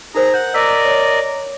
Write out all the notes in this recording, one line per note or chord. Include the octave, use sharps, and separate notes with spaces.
D#4 G#4 A#4 C5 A#5
F#5 G6
A#4 D5 D#5 E6 B6
C#5